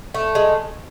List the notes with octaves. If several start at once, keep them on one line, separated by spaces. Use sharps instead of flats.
A3
G#3